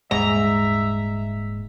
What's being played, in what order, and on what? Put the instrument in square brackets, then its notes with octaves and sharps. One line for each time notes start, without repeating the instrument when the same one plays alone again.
[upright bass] D#1 [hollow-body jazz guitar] G#2 [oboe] E5 [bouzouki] A#5